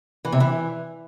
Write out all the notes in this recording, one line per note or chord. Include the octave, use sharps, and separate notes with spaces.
E3
C3
E3